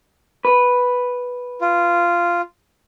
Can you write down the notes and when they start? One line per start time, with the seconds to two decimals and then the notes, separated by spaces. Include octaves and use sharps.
0.45 B4
1.61 F4